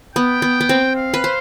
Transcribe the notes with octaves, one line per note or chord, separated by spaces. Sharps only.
B3 G5
B3
B3
C4
F5
B4
C5